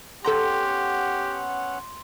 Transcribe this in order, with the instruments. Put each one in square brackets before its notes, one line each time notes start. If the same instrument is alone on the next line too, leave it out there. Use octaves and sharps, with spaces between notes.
[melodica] B3 C#4 F#5 [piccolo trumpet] G4 [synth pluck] A4 G5 A#5 [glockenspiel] C6